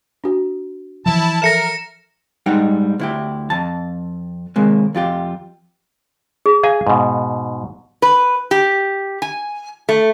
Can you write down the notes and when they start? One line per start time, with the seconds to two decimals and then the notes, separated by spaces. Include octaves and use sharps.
0.24 D4 F#4
1.06 E3 F3 E4 A5
1.42 A4 A#4 E5 A5 A#6 C#7 E7
2.46 G#2 G3 D#4 F#5 G5
3.00 D2 E4 G4
3.50 F2 A5
4.56 D#2 C3 G#3 A#3
4.94 F2 F4 G4
6.46 G#4
6.63 G#4 F5 G#5
6.87 G#2 B2
8.02 B4
8.51 G4
9.22 G#5
9.89 A3